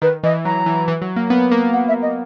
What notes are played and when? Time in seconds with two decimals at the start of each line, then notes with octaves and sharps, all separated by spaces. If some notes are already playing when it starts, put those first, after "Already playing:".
0.02 D#3 B4
0.23 E3 D#5
0.45 F#3 A#5
0.66 E3
0.88 E3
1.02 F#3
1.16 A#3
1.30 B3
1.51 A#3
1.74 F#5
1.88 E5
2.02 D#5